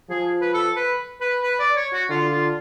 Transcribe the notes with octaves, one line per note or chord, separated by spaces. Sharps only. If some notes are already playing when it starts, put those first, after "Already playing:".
F3 G#4
B4
A4
B4
B4
B4
D5
C#5
F#4
D3 F4
F4